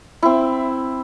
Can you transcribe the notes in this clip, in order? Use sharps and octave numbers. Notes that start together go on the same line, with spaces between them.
C4 E4